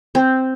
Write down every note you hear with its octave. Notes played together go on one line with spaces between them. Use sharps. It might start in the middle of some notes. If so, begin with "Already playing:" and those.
C4